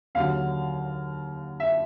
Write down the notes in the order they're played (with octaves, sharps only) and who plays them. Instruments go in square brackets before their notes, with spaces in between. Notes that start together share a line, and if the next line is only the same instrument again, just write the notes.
[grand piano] D#2 D3 F#3 F5
E5